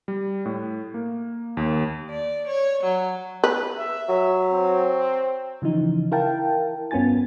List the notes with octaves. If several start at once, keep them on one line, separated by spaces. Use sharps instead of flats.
G3
A2
A#3
D#2
D5
C#5
F#3
B4
E5
F#3
C4
C#3 E3 F3 D#4
E4 A#4 F5 G5 A5
G2 B3 C#4 F4 G#5 A6